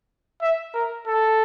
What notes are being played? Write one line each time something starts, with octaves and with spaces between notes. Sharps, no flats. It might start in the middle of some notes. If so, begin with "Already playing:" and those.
E5
A#4
A4